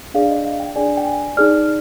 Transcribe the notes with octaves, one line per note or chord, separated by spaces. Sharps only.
D4 G#4 D5 F5
D#5
F5
G5
D4 G#4 D5 G#5
G5
G#5
D#4 G#4 D5 F6